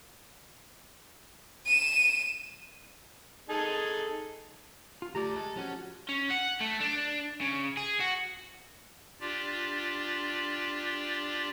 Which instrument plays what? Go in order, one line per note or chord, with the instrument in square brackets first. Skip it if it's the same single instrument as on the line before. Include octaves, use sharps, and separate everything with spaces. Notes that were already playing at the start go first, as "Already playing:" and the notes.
[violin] D#7 E7
[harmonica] D#4 G#4 A4
[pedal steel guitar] F4
[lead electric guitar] D2 A3 [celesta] G4 [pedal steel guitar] D5 A#5
[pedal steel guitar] G#3 [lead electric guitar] A4
[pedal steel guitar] F3 F#4 [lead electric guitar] C#4
[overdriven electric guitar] C#4
F#5
A3
D4
C#3
G#4
F#4
[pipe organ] D4 F4 G4 D5